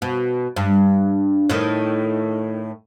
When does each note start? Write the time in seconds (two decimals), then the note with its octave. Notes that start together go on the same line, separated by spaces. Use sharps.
0.02 B2
0.56 G2
1.49 A2 D#3